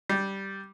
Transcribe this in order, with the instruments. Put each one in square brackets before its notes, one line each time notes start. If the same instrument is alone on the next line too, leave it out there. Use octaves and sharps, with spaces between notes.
[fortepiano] G3